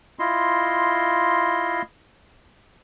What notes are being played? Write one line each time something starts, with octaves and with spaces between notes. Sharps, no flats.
E4 F4 D#5 C6